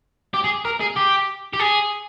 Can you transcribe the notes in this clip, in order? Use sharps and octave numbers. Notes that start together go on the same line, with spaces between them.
G4
G#4
A#4
G#4
G4
G4
G#4